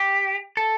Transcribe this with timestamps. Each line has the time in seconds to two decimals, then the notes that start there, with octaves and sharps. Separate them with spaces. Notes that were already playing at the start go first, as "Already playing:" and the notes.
Already playing: G4
0.57 A4